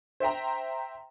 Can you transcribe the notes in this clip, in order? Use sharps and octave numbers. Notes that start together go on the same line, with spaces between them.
C5 E5 G5 A#5